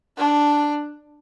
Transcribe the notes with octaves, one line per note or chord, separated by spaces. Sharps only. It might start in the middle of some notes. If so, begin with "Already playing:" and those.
D4